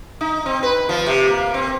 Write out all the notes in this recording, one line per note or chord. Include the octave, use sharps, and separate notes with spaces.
D#4
C4
B4
F3
C3
A#3
C4